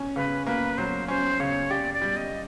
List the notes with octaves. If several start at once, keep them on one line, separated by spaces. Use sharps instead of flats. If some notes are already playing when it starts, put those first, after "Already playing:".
Already playing: C#4
C#3 B4
A#3 B4
F#3 C5
C#4 C5
C#3 C#5
G4 D5
D5
G3
D#5